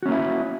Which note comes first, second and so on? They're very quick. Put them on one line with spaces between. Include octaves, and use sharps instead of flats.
F#4 C#4 A#3 E4